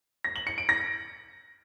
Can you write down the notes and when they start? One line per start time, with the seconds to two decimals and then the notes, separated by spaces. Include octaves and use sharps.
0.24 A#6
0.36 F#7
0.47 C#7
0.58 D7
0.69 A#6